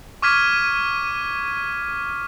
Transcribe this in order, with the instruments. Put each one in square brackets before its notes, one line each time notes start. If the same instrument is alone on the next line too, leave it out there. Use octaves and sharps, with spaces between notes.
[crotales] C#6 D6 F6 G#6 B6 D#7